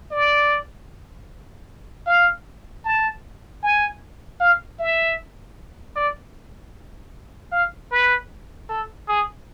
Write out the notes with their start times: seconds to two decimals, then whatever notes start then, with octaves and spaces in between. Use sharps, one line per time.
0.11 D5
2.06 F5
2.85 A5
3.63 G#5
4.40 F5
4.79 E5
5.96 D5
7.52 F5
7.91 B4
8.69 A4
9.08 G#4